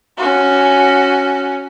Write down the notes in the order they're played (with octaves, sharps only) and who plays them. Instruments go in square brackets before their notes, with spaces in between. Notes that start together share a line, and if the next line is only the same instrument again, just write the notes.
[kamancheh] C#4 F#4